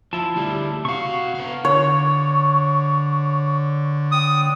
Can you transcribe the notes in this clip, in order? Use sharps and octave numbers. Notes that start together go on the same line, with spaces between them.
F3 E4 A5
D2 G3
C3 F#4 F5 C#6
B3 F5
D3 C#5 C#6
G5 D#6